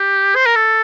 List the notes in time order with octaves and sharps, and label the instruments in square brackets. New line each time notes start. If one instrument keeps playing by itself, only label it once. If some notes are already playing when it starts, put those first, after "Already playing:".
Already playing: [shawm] G4
C5
A#4
A4